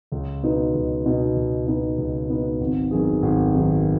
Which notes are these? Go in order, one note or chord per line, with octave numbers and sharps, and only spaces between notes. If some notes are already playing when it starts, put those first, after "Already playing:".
C#2
B2 B3 D#4 B4
C#2
B2 B3 D#4 B4
C#2
B2 B3 D#4 B4
C#2
B2 B3 D#4 B4
G#1
F#2 D#3 B3 G#4
G#1
F#2 D#3 B3 G#4